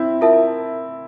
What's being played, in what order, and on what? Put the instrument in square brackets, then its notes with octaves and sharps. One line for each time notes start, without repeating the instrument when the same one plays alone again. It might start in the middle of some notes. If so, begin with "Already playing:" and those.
Already playing: [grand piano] C4 E4
[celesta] F4 A#4 E5 A5